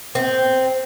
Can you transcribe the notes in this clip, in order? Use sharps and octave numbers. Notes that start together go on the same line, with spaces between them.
C4